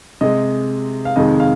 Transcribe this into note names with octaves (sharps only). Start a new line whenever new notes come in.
C3 G#3 D#5
F5
F2 C3 D#3 G#3 D#5
F5